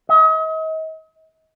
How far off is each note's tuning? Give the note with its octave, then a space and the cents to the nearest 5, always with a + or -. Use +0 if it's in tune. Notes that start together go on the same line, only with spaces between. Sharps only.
D#5 +40